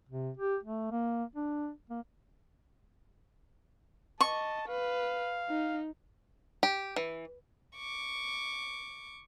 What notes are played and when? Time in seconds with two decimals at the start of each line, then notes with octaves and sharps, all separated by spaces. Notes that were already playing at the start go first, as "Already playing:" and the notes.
0.09 C3
0.37 G4
0.63 A3
0.91 A#3
1.36 D4
1.90 A#3
4.21 D#5 A5 C#6
4.68 B4 F5
5.49 D#4
6.63 G4
6.96 E3
7.76 C#6 D6